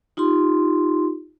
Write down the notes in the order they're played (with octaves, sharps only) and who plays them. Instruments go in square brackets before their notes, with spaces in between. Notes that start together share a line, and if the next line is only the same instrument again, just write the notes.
[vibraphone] D#4 F4 G4 C6